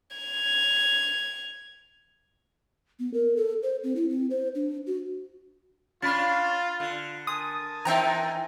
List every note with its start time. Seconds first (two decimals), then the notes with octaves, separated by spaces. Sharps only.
0.17 G#6 F7
2.99 B3
3.14 A#4
3.37 A4
3.63 C5
3.84 C4
3.96 E4
4.09 C4
4.30 C5
4.55 D4
4.87 F#4
6.02 C#4 D4 F4 B5 A6
6.80 D3
7.27 A#4 G#5 A5 C6 D#6
7.85 E3 C4 D#4 E5 G5 A#5